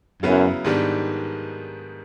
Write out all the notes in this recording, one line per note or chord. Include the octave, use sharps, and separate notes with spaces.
F#2 C#3 F#3 B3 E4
G#2 D#3 G3 B3 D4